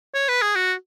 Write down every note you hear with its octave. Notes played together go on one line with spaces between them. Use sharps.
C#5
B4
G#4
F#4